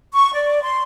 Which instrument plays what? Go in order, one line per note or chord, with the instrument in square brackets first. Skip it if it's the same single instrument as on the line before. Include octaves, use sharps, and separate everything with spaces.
[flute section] C#6
D5
C6